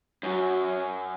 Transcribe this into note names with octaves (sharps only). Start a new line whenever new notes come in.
F#2 F#3